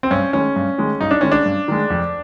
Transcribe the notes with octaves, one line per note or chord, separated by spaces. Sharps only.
C4
G2 C#4
D#3 G#3 C#4
G2
D#3 G#3
G2 D#4
D4
D#3 G#3 C#4
D4
G2
D#3 G#3
F2